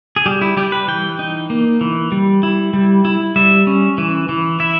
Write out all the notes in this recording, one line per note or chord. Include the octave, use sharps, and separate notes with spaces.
G#4
G3 G4
E4
G3 G4
B4
E3 G5
D#4
A#3
E3
G3
E4
G3
E4
G3 E5
C#4
E3
E3
E4 E5